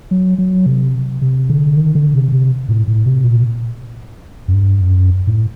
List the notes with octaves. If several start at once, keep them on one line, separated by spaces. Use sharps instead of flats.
F#3
F#3
C3
C3
D3
D#3
D3
C3
C3
A2
A2
C3
A#2
F#2
G2
F#2
A2